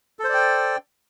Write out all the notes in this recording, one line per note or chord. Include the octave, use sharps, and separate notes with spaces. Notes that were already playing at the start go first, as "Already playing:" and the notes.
A4 C5 D5 G5